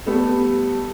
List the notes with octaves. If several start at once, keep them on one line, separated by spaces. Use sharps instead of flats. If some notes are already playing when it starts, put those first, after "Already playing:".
G3 A3 B3 A4